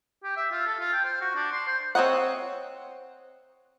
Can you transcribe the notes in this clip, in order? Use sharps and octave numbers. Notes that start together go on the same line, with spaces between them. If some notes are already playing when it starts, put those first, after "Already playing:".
G4
E5
F4
A4
F4
G5
C5
F#4
D4
C6
C5
C4 C#5 D#5 F#5